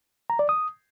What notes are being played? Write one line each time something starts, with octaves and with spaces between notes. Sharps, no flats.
A#5
D5
D#6